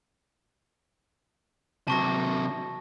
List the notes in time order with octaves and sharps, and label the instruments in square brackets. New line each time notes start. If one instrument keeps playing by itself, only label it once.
[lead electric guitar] C3 F#3 [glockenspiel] A5 C#6 A#6